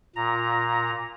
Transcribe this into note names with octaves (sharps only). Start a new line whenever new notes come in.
A#2 A#5